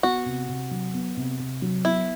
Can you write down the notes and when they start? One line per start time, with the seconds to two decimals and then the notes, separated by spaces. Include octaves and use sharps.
0.03 B3 F#4
0.26 C3
0.49 C3
0.71 F#3
0.94 B3
1.17 C3
1.39 C3
1.62 F#3
1.85 B3 E4